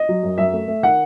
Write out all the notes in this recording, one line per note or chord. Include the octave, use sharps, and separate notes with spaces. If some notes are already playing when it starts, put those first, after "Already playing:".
Already playing: D#5
F#3
F#2
F#2 E5
A3
A3
D#3 F#5